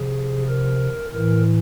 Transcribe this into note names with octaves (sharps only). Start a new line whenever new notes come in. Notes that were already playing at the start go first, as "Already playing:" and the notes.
Already playing: C3 F3 G#4
A#4
A2 E3 A#4